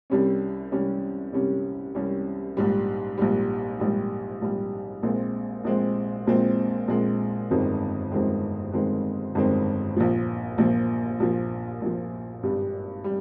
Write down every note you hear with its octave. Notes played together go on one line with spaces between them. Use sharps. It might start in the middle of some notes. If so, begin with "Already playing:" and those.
C2 C3 G3 C#4
C2 C3 G3 C#4
C2 C3 G3 C#4
C2 C3 G3 C#4
A#1 G#2 G3
A#1 G#2 G3
A#1 G#2 G3
A#1 G#2 G3
A#1 A#2 G#3 C4
A#1 A#2 G#3 C4
A#1 A#2 G#3 C4
A#1 A#2 G#3 C4
G1 F2 D#3 G#3 C4
G1 F2 D#3 G#3 C4
G1 F2 D#3 G#3 C4
G1 F2 D#3 G#3 C4
A#1 A#2 F3
A#1 A#2 F3
A#1 A#2 F3
A#1 A#2 F3
G#1 G2 G3
G3